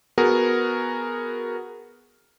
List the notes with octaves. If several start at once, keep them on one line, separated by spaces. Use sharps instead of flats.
B3 F#4 G#4 A#4